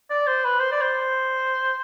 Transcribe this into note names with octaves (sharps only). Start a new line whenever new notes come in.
D5
C5
B4
C5
D5
C5